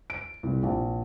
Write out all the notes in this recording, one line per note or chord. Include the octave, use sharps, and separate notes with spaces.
D7
C2
A#1